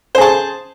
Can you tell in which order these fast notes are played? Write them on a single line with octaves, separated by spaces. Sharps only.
C5 G#4 A5